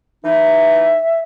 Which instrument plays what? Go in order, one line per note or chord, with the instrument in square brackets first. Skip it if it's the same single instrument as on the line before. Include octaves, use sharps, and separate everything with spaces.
[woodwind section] E3 D#4 [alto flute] E5